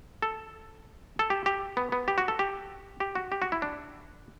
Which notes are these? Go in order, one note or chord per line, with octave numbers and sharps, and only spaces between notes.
A4
A4
G4
G4
B3
B3
G4
F#4
A4
G4
G4
F#4
G4
F#4
E4
D4